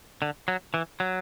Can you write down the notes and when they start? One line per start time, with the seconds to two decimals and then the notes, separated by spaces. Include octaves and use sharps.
0.22 D3
0.48 F#3
0.74 E3
1.00 F#3